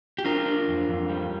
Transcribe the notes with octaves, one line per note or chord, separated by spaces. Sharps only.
G4
D4 F4 A#4
D4
F2
F2
G3